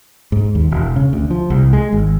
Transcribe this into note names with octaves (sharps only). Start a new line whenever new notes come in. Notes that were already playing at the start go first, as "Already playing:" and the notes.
G#2
D#2
E1
C#3
D2
F3
C2
G#3
G#1